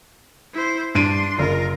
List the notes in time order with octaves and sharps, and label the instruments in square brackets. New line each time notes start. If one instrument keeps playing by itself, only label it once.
[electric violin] E4 C5
[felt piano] G2 D7 D#7 [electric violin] D4 C6
[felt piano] F#1 [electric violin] F4 A#4